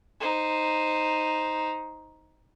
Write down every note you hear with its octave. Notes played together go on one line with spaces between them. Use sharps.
D#4 C5